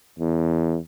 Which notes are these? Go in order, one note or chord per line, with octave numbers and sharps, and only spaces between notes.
E2